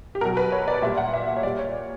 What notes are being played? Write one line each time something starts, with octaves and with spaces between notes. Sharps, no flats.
G4
B2 F#3 A#4
B4
C#5
D5
A#2 G3 E5
F#5
E5
C#5
A#2 G3 D5
C#5